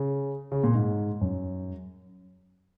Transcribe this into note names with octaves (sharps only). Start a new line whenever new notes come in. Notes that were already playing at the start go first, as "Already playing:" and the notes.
Already playing: C#3
C#3
A#2
G#2
F#2